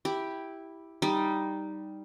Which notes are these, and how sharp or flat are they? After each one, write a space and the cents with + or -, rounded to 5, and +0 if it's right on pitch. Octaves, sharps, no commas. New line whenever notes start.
E4 -5 G4 +0
G3 +0 D#4 +0